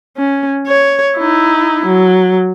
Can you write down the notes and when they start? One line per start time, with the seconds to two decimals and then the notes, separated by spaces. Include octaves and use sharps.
0.17 C#4
0.67 C#5
1.18 D#4 E4
1.86 F#3